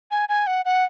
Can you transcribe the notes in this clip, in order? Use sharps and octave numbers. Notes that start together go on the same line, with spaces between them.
G#5
G#5
F#5
F#5